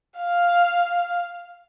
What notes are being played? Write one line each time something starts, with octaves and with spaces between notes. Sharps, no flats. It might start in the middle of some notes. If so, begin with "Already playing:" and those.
F5